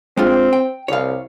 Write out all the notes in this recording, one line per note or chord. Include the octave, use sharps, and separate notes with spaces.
G#3 C4 D4 F4
G5
C2 C#5 F5